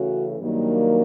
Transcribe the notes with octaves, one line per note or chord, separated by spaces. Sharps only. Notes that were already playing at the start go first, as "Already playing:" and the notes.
Already playing: C#3 E3 A3 C#4 F#4
G2 D#3 F#3 A#3 D4